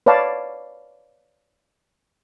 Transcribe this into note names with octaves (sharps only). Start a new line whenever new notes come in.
B4 C#5 D5 F5 A5